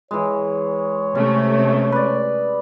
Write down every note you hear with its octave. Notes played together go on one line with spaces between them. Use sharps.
E3 G#3 C#5
C3 A3 C#4
B4 D5